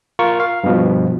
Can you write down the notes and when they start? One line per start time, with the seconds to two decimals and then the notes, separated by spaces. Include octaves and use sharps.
0.19 F4 A#4 C#6
0.40 F5
0.64 G2 B2 F3